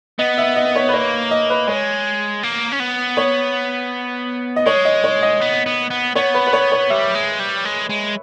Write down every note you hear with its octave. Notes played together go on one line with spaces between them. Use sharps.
B3 D#5
E5
D#5
C#5
B4
A#3 C#5
D#5
B4
G#3 C#5
A#3
C#4
B3
C#5
D#5
G#3 C#5
D#5
C#5
D#5
B3
B3
B3
B3 C#5
B4
B4
C#5
C#5
G3 E5
G#3
G3
G#3
G#3